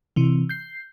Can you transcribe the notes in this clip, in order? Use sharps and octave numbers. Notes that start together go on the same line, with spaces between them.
C3 E3
G6 C7